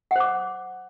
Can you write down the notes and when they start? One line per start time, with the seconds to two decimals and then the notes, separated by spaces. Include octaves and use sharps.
0.11 F#5
0.16 C5
0.20 D6